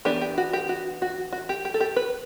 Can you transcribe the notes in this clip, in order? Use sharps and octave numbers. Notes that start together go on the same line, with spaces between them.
E3 B3 D4 G4
G4
F#4
G4
F#4
F#4
F#4
G4
G4
A4
G4
B4